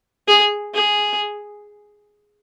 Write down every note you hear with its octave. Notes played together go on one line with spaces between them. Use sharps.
G#4
G#4